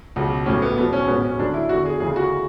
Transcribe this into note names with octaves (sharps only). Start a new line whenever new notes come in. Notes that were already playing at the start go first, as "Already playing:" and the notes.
C#2 B2 F#3
A1 A2 F#3 C#4
B3
E2 B2 F#3 B3
C#4
A1 G#2 F#3 B3
C#4
D2 D3 F#3 D4
E4
E2 D3 F#3 F#4
G#4
D2 C#3 E3 G#4
F#4